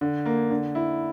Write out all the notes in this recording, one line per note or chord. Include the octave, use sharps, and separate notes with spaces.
D3
A#3
D3
E4